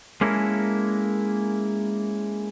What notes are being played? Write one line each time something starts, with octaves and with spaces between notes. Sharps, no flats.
G#3 A#3 C#4 E4 A4 A#4